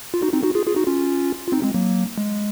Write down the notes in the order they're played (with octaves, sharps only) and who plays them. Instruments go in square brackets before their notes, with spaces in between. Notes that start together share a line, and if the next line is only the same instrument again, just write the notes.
[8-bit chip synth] F4
D#4 F#4
C4 D#4
D#4 F#4
F4 G#4
F4 G#4
D#4 F#4
C#4 F4
F4
C4 D#4
G#3 C4
F#3 A#3
G#3